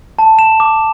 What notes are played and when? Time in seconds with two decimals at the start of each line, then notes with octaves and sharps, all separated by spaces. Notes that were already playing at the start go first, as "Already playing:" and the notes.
0.19 A5
0.39 E7
0.60 D6